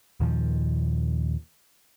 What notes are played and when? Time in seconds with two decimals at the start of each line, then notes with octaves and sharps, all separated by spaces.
0.20 D#2 A#2 D#3 F3